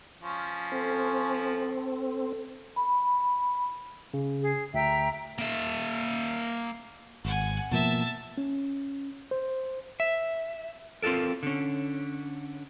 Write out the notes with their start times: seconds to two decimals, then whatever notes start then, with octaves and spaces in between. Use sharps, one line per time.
0.21 F3 C#4
0.72 C4 A4
2.76 B5
4.14 C#3
4.43 G#4
4.74 D2 E5 G5 A#5
5.39 A#3 E5
7.25 G#1 F#5 G#5
7.71 B2 F3 A#3 E5 A5
8.38 C#4
9.31 C5
10.00 E5
11.02 C4 F4 F#4 A4 A#4
11.43 D3 C#4